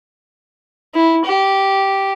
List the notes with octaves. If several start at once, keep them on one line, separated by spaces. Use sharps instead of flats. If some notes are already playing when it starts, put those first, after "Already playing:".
E4
G4